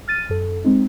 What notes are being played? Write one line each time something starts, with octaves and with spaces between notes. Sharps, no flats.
F6 A6 D#7
F#2 A4
G#3 C4 D#4